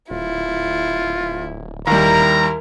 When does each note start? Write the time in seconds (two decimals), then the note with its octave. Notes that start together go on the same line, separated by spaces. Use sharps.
0.10 D1 E4 F4
1.87 D#2 G3 E4 A#4 A#5